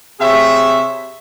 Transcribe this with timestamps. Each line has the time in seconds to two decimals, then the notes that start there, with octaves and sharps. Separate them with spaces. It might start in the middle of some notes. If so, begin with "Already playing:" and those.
0.20 C3 G#4 C#5 E5